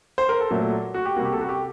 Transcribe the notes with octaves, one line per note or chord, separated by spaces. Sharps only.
C5
A#4
A4
A#2 F#3 A3
F#4
G4
C3 G3 A#3 F#4
G4
A4
F#4
G4